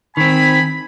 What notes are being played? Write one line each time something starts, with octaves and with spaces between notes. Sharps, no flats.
D#3 C4 G#5 B5